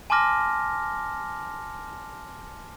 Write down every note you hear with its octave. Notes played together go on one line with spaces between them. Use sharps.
G#5 A5 C6 D6 F6 A#6